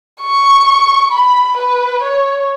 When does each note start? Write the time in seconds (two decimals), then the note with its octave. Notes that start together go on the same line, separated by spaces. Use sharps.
0.21 C#6
1.12 B5
1.57 B4
2.02 C#5